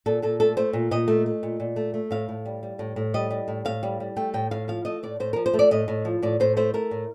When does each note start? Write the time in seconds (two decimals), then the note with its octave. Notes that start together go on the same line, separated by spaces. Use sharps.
0.06 A#2 A4
0.22 A#2 A4
0.40 A3 A4
0.57 A3 C5
0.73 A#2
0.91 A#2 D#5
1.08 A3
1.26 A3
1.43 A#2
1.60 A#2
1.76 A3
1.94 A3
2.11 A2 F5
2.29 A2
2.45 G3
2.63 G3
2.79 A2
2.96 A2
3.14 G3 D#5
3.31 G3
3.48 A2
3.65 A2 F5
3.83 G3
4.00 G3
4.16 A3 G5
4.34 A2 G5
4.51 A2 F5
4.68 F3 F5
4.85 A3 D#5
5.03 A2 D5
5.20 A2 C5
5.33 F3 A#4
5.46 C5
5.53 A3
5.59 D5
5.71 A2 D#5
5.88 A2
6.05 F3
6.22 A2 D5
6.40 A2 C5
6.57 A3 C5
6.74 A3 A#4
6.91 A2